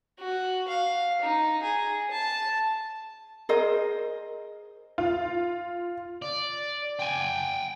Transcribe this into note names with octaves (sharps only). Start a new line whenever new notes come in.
F#4
F5
D#4
G#4
A5
G#4 A#4 C5 D#5
F4
D5
G5 G#5